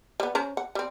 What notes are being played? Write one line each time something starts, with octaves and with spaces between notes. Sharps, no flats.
G3 B3
C#4 C5 A#5
F#5
G3 C4